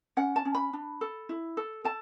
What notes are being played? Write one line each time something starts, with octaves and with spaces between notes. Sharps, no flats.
C#4 F#5
A5
C#4
B5
D4
A4
E4
A4
A4 A5